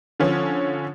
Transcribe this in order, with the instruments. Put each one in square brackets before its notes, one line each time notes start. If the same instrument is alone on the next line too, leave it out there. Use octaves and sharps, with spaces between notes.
[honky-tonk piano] D3 F3 C#4